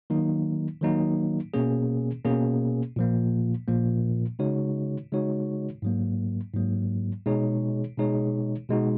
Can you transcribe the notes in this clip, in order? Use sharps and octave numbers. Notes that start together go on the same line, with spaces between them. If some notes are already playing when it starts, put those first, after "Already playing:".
D#3 F#3 A#3 D#4
D#3 F#3 A#3 D#4
B2 A#3 C#4 G#4
B2 A#3 C#4 G#4
A#2 F3 A#3
A#2 F3 A#3
C#3 G#3 D#4 F#4 C#5
C#3 G#3 D#4 F#4 C#5
G#2 F#3 A#3
G#2 F#3 A#3
B2 G#3 D#4 G#4 C#5
B2 G#3 D#4 G#4 C#5
B2 G#3 D#4 F#4